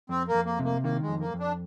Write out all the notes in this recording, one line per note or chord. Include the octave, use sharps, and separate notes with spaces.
F2 C4
A#3
F2
A#3
C3
A#3
D#3 A#3
G#3
F2
A#3
F2
D4